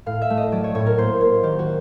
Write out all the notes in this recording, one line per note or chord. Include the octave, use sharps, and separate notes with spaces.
A2 F5
E5
A3
D#5
F#3 D5
C#5
A2 C#5
A#4
A#3 C5
A#3
D#3 G4
F#4